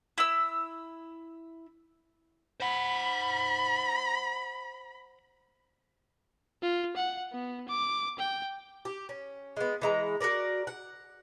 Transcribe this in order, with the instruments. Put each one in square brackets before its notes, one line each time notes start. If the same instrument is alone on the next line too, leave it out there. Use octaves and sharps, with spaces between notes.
[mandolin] E4 E6
[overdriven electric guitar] C5 F#5 [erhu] B5
[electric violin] F4
F#5
B3
D6
G5
[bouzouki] G4
C#4
G#3 B3
E3 G#3 A#5
F#4 G#4 A#4 D5
F#5